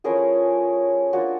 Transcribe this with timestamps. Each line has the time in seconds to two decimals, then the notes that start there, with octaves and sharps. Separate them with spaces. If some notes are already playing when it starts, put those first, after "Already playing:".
0.04 F3 A3 C#4 E4 G#4 A#4
1.13 A#3 D4 F4 F#4